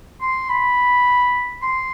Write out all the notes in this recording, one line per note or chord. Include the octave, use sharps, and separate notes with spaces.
C6
B5
C6